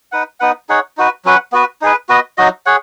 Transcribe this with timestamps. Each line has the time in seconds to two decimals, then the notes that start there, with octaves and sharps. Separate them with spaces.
0.12 D#4 B4 F#5
0.40 B3 D#4 B4 F#5
0.69 D#4 G#4 C#5 F#5
0.97 D#4 F#4 B4
1.25 F#3 C#4 B4 F#5
1.52 B3 F#4 B4
1.81 D#4 G#4 B4
2.09 B3 F#4 B4 D#5
2.38 F#3 D#4 F#4 D#5
2.66 G#4 C#5 F#5